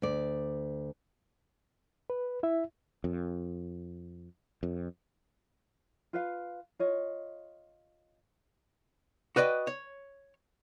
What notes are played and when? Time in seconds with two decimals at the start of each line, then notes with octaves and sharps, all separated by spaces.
0.02 D2 D5
2.10 B4
2.43 E4 E5
3.04 F2
4.63 F2
6.13 F4 B4 F5
6.79 F4 C#5 D#5
9.36 F#4 B4 D5 D#5 G5
9.67 C#5